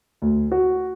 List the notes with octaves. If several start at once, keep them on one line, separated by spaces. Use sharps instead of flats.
D2
F#4